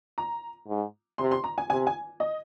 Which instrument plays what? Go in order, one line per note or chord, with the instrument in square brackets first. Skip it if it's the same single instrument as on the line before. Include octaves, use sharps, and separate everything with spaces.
[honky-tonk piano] A#5
[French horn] G#2
[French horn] C3 [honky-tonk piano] C6
[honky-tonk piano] C6
A#5
G#5
[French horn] C3 [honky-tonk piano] G#5
[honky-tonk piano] G#5
D#5